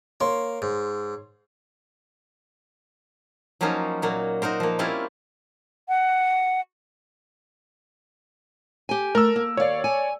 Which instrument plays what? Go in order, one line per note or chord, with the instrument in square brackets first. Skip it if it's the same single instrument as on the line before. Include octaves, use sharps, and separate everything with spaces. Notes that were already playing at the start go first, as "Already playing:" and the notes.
[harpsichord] A#3 [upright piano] C#5 C6
[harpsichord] G#2
[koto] F3 F#3 A#3 C#4 D#4 F4
A#2 F#3 A#3
D#4 F#4 A#4 C5
F3 A#3
G3 A#3 C4 C#4 E4 F4
[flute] F#5
[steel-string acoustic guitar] G4 G#5
[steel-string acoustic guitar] A3 [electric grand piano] A#4 E6
[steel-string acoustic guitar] A#3
[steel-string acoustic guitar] D#2 F5 [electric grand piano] C#5 D5
[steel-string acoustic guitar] G#5